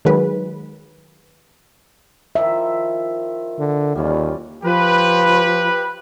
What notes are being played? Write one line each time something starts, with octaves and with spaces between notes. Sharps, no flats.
D#3 F#3 G#3 B4
D#3 F3 E5
D3
D#2 G3 C#4 F4
F3 G4 B4